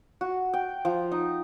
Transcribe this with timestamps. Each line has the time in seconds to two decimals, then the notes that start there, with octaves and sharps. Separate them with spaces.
0.21 F#4
0.54 G5
0.85 F3
1.12 D#4